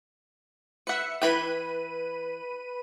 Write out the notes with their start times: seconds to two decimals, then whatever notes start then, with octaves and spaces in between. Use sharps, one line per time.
0.87 B4 E5 F#5 C#7
1.22 E3 B4 G5 B5 D#7